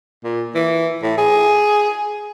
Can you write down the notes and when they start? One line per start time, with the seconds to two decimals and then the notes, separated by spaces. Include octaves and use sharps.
0.24 A#2
0.55 E3
1.03 A2
1.18 G#4